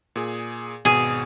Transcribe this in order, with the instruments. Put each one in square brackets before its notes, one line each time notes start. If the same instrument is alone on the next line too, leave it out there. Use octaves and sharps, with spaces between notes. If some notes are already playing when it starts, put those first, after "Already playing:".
[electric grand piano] A#2 G#4
[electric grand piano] G#1 B2 [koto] G#4